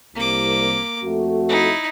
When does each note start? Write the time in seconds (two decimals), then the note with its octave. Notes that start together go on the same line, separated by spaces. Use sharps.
0.15 C2 A#3 D6
1.03 F2 A3 F#4
1.49 D#4 E4